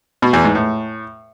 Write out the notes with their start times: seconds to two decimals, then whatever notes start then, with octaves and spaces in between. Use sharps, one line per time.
0.22 B2
0.33 E2
0.44 G#2
0.55 A2